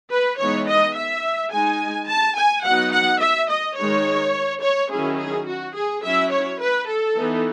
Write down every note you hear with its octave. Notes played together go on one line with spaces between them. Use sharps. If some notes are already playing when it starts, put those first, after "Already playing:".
B4
E3 G#3 B3 D#4 C#5
D#5
E5
G#3 D#4 G#5
A5
G#5
F#3 B3 D#4 F#5
F#5
E5
D#5
D#3 G#3 D#4 C#5
C#5
D#3 F#3 C#4 E4 G#4
G#4
F#4
G#4
F#3 C#4 E4 E5
C#5
B4
A4
E3 B3 D#4